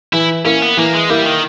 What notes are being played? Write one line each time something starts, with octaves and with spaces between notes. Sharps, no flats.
E3 E4
A#3 C#4 E4
B3
E3 A#3
G#3
G3 A#3 E4
D#3